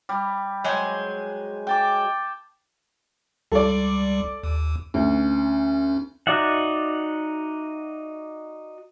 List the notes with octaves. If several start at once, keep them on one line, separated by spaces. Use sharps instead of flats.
G3
F#3 G#3 C5 G#5
G5 A5 D6
C#2 G3 A4 D5
D#2
D2 C#4
D#4 F#4 D5 E5 F#5